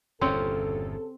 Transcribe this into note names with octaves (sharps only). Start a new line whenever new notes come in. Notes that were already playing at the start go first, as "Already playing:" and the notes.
G1 E2 A#2 C#3 C4 C#4 G4 A4